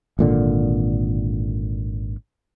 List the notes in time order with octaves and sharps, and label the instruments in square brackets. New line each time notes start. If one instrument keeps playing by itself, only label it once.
[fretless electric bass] G#1 A#2 D3